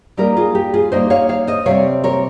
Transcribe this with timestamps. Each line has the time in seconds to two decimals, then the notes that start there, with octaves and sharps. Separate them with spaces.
0.17 G3 A#3 D#4 G4 A#4
0.37 F4 G#4
0.55 G4
0.74 F4 G#4
0.92 G3 A#3 D#4 C5 D#5
1.10 C#5 F5
1.29 C#5 F5
1.47 C5 D#5
1.66 C3 G3 C4 C#5 F5
2.04 A#4 C#5